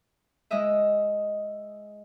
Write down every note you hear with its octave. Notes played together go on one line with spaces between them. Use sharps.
G#3 E4 D#5 E5